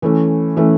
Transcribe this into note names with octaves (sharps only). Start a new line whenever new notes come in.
E3 A3 C#4
E3 A3 C#4